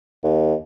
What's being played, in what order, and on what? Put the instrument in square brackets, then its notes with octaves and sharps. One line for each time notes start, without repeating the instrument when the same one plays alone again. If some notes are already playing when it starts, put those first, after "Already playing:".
[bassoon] D#2